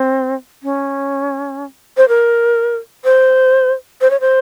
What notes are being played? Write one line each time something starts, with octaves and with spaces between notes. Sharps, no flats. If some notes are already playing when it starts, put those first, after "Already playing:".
Already playing: C4
C#4
C5
A#4
C5
C5
C#5
C5